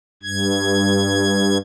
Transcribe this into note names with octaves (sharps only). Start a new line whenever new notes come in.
G2 G#6